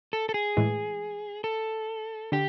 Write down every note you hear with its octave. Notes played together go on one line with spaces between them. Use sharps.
A4
A4
G#4
A2 E3 G#3
A4
D3 G4